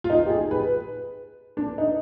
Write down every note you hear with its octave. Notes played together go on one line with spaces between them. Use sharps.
F4
D#4
G4
G#4
B4
D4
D#4